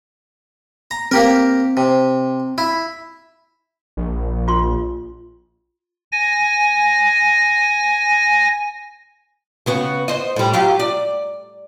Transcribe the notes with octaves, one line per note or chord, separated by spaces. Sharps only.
A#5
A#3 C4 G4 A#4
C3
E4
A#1
F4 C6
G#5 A#6
C#3 B3 F#4
C5 D#5
A2 G3
F#3 F4 G4
D5